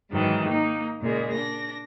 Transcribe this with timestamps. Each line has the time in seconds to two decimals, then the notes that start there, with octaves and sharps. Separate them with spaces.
0.12 G#2 D#3 E3 F#3
0.48 A#3 D#4
1.02 A#2 C#3 G#3
1.32 D4 A#6